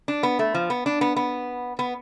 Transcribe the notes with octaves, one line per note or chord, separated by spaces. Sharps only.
D4
B3
A3
F3
B3
D4
B3
B3
B3